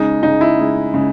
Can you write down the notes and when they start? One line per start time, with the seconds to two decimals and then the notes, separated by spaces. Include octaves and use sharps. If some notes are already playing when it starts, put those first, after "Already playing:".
Already playing: C#3 G#3 D#4
0.23 C#3 G#3 D#4
0.41 E4
0.58 C#3 G#3
0.94 C#3 G#3